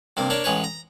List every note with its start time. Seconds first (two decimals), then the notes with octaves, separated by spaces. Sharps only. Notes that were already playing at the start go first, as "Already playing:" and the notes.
0.17 G2 C3 A#3
0.30 A#3 D4 C#5
0.44 A1 G#3 B4 C#5
0.64 A#5